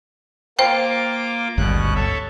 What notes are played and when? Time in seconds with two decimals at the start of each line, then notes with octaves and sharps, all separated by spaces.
0.59 A#3 F4 C5 G5 D6
1.58 G#1 D2 G2 B2 C#4 F#6
1.95 A4 C#5 E5